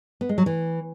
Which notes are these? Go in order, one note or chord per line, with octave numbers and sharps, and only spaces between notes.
B3
G#3
F#3
E3